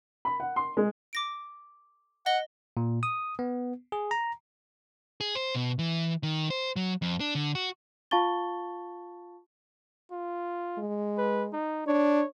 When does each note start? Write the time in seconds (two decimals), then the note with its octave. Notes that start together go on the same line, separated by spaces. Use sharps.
0.25 B5
0.40 F#5
0.56 C6
0.77 G#3
1.13 D6 A#6 D7
2.26 D#5 F#5 A#6 G7
2.77 A#2
3.03 D#6
3.39 B3
3.92 G#4
4.11 A#5
5.21 G#4
5.35 C5
5.55 B2
5.79 E3
6.23 D#3
6.50 C5
6.76 F#3
7.02 F2
7.20 D4
7.35 D3
7.55 F#4
8.11 F4 F5 A5 C#6 A6 G7
10.12 F4
10.78 G#3
11.18 B4
11.52 D#4
11.87 D4 C#5